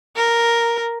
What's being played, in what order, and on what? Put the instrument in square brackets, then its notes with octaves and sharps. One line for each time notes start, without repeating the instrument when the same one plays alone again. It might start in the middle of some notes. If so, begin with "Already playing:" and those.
[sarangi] A#4